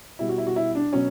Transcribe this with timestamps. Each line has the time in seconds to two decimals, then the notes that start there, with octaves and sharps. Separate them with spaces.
0.19 B2 G3 E4
0.29 F#4
0.38 E4
0.47 F#4
0.56 E4
0.75 D4
0.93 B2 F#3 C#4